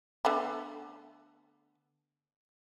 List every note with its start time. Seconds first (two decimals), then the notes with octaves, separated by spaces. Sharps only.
0.25 D3 A3 B3